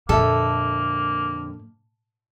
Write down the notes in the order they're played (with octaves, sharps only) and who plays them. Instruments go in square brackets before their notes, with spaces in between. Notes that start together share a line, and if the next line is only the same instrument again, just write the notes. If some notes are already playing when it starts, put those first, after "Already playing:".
[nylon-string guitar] F2 D3 E5 [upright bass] A#2 [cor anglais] A#3 [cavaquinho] A4